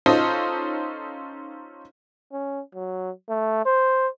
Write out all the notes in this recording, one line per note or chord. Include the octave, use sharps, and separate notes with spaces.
C#4 D#4 F4 A4 C5 D#5
C#4
F#3
A3
C5